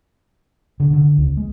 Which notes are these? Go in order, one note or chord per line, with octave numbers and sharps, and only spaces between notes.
D3
D3
C#2
G#3